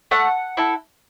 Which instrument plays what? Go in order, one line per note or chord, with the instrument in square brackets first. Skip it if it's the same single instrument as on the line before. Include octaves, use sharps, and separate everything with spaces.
[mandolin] A3 F#5
E4 A4